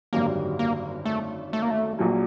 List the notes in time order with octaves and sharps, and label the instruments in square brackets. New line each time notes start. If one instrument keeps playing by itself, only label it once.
[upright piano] G#1 F#2 D3 G3 [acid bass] A#3
[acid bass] A#3
A3
A3
A#3
A3
[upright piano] A#1 A#2 F#3